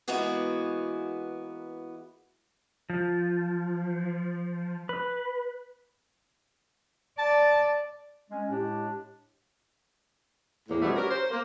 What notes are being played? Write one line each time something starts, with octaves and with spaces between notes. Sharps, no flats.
E3 G#3 A#3 B3 F#4 G#4
F3
B4
D5 A5
G#3 C#4
A2 G#3 D4 G4
E2 A2 A#3
B2 F3 G3 A3 B3 C#4
C#4 F#4 G4 A#4
C5
A#3